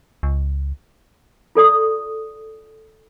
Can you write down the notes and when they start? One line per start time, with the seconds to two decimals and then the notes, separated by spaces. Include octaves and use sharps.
0.23 C#2
1.55 F4 A4 D5 D#6